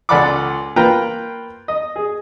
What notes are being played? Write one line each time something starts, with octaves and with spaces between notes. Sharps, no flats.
C#2 A4 D5 F#5 B5 D6
A#3 F4 B4 G5 A#5
D#5
G#4